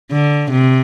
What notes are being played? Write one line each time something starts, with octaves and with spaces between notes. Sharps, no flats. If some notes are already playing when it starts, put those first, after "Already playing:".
D3
C3